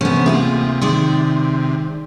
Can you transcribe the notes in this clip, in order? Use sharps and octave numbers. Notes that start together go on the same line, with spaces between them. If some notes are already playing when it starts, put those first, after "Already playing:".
C3 E3 B3 C#4 D4 A4
D2 A#3 F4 G#4 E5
D#3 G#3 D5 C6 D6